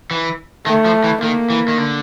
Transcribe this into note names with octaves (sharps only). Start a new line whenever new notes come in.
E3
D#3 A3
F3
E3
D#3 A#3
E3
D#3
D3